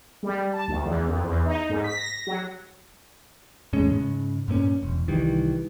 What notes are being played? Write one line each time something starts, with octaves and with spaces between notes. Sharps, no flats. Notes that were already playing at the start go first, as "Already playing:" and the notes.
G3
A5
D2
E2
F2
E2
D#4
G#2
B6
A#6
F#3
E2 A2 G#3 C#4
G#2 C#3
G2 A#2 A#3 C#4
E1
C2 D#3 E3 G3